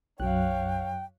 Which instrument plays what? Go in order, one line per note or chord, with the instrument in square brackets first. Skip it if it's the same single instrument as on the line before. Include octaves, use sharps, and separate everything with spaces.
[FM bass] B1 [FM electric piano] F#2 F#3 F#6 [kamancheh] C#5 F5 [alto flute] G5